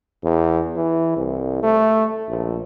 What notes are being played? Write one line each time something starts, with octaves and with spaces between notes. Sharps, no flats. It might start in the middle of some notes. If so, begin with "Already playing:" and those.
E2
E3
C2
A3
A#1